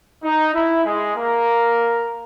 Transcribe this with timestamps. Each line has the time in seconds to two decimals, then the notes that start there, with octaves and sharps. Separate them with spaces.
0.23 D#4
0.54 E4
0.85 G#3 G#4
1.15 A#3 A#4